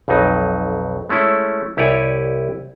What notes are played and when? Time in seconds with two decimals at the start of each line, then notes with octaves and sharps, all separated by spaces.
0.08 B1 F2 F#3 D#4
1.09 G#3 A3 C#4 E4
1.77 C2 E4 G4 C#5 D5 G#5